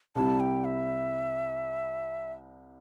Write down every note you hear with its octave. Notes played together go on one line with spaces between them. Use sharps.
C2 C3 G3 E4 A5
G5
E5